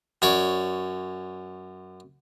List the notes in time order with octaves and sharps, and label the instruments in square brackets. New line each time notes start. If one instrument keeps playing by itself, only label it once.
[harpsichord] F#2 C#5 D5